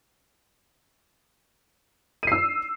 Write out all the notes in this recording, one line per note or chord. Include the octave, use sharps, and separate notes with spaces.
E6 C7 D#7